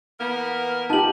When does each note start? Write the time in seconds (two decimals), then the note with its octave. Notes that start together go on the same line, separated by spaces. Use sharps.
0.20 E3 A#3 B3 A#4
0.90 D#4 F4 G4 A5 F#7